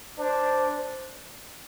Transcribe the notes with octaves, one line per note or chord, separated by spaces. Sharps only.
D4 C5